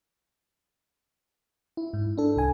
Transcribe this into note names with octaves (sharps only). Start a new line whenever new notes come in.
E4
G#2
D4 A4
C2 G#5